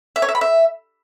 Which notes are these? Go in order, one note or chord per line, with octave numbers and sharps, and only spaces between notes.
E5
C#5
E5
B5
E5